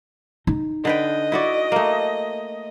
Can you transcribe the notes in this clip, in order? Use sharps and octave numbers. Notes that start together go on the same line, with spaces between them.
D#4
D3 B4 D#5 G5
E4 F#4 D5
A3 A#3